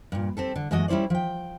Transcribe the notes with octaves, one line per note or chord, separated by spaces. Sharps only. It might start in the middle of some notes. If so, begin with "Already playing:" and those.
G2 A#2
C4 G4 A4
D3
F#2 E3 G#3 A3 F#4 D#5
G3 C#4 E4 C5 D5
F3 G5